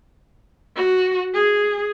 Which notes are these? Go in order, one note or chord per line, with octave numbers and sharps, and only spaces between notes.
F#4
G#4